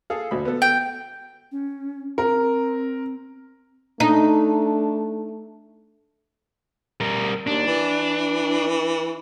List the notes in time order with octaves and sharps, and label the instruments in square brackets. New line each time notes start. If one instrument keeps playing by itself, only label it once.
[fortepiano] G#4 A4 F5
D2 B5
B3 A4
[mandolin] G5
[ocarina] C#4
[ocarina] C4 [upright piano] A#4
[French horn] A3 [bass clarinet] D4 [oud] D#4
[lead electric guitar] G3 A#4
[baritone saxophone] D#2 [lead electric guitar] D4
[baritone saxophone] E3